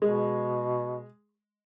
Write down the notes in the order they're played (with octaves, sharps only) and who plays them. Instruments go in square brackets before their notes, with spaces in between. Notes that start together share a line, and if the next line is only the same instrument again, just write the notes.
[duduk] B2 [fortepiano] G#3